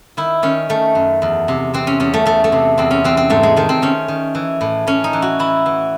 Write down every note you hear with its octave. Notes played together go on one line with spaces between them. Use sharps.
D#3 E4
D#3 C#4
D#3 A3
F#2
E2
C3
E3 C4
C#4
E2 C#4
A3
E2 A3
A3
C3
E2 C4
C#4
E3 C4
C4
G#2 A3
G#3
D#3 A3
C4
D#3 C#4
D#3
E3
A2
A2 C#4
D#4
E3
F#4
E3 E4
E3